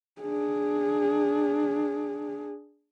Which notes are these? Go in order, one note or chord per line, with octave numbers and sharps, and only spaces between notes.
D4 G#4